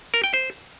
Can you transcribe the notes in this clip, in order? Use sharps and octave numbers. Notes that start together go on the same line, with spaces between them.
A#4
G5
C5